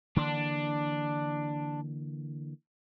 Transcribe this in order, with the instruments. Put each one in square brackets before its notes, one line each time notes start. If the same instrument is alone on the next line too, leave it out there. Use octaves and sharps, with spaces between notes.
[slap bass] D3 E3 A#3 [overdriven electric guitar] D4